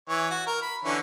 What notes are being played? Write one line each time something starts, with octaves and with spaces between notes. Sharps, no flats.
E3 C#5
F#4
A#4
B5
D3 E3 C#4